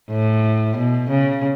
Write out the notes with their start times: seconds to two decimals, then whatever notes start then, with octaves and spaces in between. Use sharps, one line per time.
0.11 A2
0.77 B2
1.10 C#3